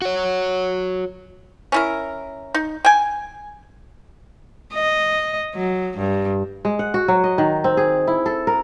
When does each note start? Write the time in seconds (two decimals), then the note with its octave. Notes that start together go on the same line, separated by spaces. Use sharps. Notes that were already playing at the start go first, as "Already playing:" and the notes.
0.02 F#4 C#5
1.72 C#4 E4 A#4
2.54 D#4
2.85 G5 G#5
4.73 D#5
5.55 F#3
5.98 G2
6.65 G#3
6.79 F#5
6.94 F#4
7.08 F#3
7.24 D#5
7.38 D#3
7.64 C4
7.77 G#4
8.07 E4
8.26 A4
8.47 A#4